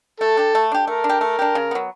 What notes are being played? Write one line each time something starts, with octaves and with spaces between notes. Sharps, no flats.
A3 A4
D4 G4
A3
D4 G4
A3 A#4
D4
G4
A3
D4 G4
C#3
F#3 B3